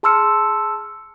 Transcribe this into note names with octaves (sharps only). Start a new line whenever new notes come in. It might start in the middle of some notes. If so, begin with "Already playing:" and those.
G#4 A5 C6 E6 F6 C#7